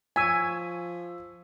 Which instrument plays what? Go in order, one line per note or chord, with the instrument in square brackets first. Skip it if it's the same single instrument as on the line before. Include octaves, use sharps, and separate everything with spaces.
[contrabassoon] F3 [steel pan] G#5 [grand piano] C#6 E6 B6